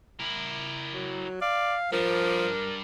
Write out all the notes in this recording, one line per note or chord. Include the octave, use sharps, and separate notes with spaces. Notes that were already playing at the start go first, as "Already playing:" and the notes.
E4 A#4
F#3
D5 F5
F3 G3 D4 A#4